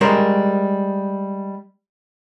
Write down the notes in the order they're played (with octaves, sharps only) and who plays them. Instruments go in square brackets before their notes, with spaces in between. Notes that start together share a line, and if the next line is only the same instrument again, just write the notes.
[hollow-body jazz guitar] G3 G#3 A#4 C5